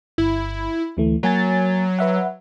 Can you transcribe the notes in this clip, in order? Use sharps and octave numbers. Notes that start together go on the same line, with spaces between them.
G1 E4
D2 E3 A3
F#3 A#3 G#5 A6
B4 E5 F#5